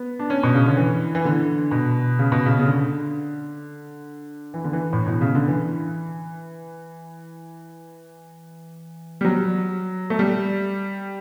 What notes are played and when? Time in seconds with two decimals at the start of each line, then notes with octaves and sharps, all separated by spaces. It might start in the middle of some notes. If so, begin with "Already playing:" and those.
Already playing: B3
0.19 D4
0.30 C#4
0.43 B2
0.54 C#3
0.66 D3
0.77 E3
1.15 E3
1.25 D3
1.71 B2
2.19 C#3
2.32 B2
2.46 C#3
2.59 C#3
2.66 D3
4.54 E3
4.64 D3
4.73 E3
4.93 A2
5.06 B2
5.21 C#3
5.35 D3
5.48 E3
9.21 G3
9.25 F#3
10.10 A3
10.19 G3